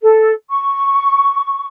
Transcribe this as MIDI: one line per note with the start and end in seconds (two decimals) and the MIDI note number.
0.02 0.31 69
0.49 1.68 85